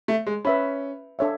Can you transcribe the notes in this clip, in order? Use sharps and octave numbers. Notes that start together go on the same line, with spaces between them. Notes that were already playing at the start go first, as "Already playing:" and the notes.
A3
G#3
C#4 B4 E5 B5
D4 A4 C#5 E5